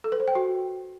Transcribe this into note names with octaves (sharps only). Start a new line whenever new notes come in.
A4
B4
C5
G5
F#4